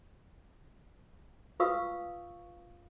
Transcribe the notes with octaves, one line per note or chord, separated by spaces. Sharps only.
F4 B4 F5 C#6 D#6 E6